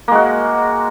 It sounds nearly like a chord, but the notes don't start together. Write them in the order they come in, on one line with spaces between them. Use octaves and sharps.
A#3 G#3 F#4